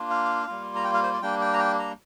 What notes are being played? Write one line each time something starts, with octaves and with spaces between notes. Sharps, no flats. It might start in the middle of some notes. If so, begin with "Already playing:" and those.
Already playing: A#3 D4 F4
F5
G3 A#3 F4
A#5
G5
F5
C5
D5
G3 A#3 D4 G5
G5
A#5
G5
A#5